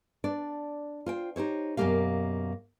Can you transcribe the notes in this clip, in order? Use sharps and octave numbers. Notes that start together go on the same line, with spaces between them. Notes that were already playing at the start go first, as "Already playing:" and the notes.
D4 D5
F4 C5 G5
D#4 G4 C5 C#5
F#2 B2 A3 A#3 G4 F5